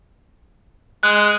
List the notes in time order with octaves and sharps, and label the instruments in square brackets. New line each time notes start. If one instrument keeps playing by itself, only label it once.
[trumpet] G#3 [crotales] F#6